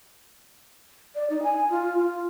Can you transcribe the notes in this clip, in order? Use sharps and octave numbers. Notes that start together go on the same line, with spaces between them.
D5
D#4
G#5
F4
F4